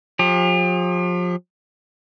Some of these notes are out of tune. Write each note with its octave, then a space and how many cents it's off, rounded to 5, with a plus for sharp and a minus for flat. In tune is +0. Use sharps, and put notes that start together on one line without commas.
F3 +35 G4 +45